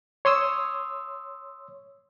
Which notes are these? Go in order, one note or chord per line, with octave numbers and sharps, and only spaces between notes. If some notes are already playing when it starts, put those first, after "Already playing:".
C#5 C6 D#6 E6